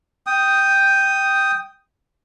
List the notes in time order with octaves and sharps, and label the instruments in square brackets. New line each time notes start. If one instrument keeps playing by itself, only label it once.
[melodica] G5 D#6